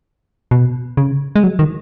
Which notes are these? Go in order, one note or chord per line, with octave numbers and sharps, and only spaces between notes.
B2
C#3
G#3
F#3
D#3